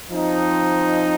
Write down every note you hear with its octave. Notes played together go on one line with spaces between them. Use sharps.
F3 C4 D#4